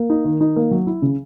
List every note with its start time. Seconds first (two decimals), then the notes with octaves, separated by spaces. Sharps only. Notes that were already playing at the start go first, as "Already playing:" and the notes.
Already playing: A#3
0.10 D#4
0.25 D#3
0.41 D#4
0.56 A#3
0.71 F#3
0.87 E4
1.02 C#3